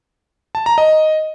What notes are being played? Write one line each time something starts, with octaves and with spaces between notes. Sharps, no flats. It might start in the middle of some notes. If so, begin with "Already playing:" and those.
A5
A#5
D#5